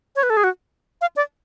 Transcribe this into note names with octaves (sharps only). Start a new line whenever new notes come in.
C#5
B4
A4
G#4
F#4
F5
D5